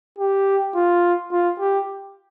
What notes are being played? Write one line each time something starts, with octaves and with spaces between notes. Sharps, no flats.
G4
F4
F4
G4